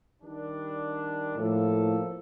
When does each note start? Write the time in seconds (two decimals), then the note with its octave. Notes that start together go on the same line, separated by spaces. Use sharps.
0.21 D#3 G3 D4
1.36 A2 F3 A#3 A4